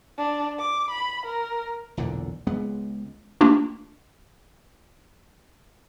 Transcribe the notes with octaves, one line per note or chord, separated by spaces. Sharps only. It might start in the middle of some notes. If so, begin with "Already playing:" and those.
D4
D6
B5
A#4
B1 E2 A#2 D3
C#2 G#3 B3
A3 A#3 D4 F4 G4